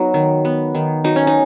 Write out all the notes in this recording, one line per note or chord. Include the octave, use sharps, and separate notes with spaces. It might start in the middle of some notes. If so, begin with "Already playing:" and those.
Already playing: F#3 B3 D#4
D#3
B3
D#3
F#3 D#4
C#4
D#4